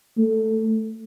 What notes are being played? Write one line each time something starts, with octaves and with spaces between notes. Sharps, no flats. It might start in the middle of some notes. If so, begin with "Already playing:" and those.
A3